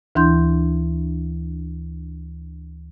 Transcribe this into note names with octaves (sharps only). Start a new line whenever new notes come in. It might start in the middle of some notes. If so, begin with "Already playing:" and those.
D2 E3 D4 E4 C6 G6